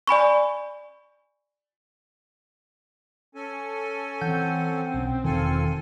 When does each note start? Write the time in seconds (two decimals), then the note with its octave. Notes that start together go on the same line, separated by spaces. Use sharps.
0.07 D5 G#5 B5 C#6
3.35 C#4 A4 G#5
4.21 E3 C4 F#5 G6
4.94 B1 C#4
5.25 E1 D#3 F4 A4 G#5